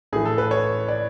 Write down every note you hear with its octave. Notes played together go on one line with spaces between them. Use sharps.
A2 E3 G#4
A4
B4
C#5
D5